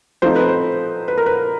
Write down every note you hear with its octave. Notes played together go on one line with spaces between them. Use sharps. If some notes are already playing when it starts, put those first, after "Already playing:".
F3 A3 C4 D#4 C5
B4
C5
B4
A#4
B4